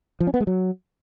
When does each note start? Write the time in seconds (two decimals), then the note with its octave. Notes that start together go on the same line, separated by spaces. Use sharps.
0.20 F3
0.27 C#4
0.34 B3
0.40 G#3
0.47 F#3